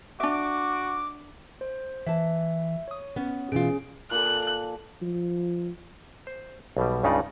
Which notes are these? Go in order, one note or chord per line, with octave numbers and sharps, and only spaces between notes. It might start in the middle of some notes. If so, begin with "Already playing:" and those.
D4 F#4 E5 D6
C5
E3 E5 A5
C#5 D#6
B3 C#4
B2 E3 C#4 F4 G#4 D7
A#2 A4 F#6
F3
C5
B1 B2 G3
C#2 G2 C#3 D#4 F4 D5